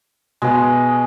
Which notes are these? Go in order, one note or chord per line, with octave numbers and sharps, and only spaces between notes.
B2 G#3 B3